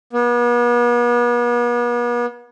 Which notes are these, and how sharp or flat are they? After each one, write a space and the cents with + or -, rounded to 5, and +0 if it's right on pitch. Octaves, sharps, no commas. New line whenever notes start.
B3 -40